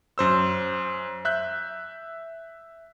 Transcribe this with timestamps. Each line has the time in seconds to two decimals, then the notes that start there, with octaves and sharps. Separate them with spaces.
0.18 F#2 C5 E6
1.25 E5 F#6 G6